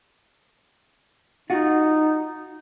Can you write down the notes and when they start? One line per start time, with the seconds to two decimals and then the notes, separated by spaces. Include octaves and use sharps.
1.50 D#4 F4 F#4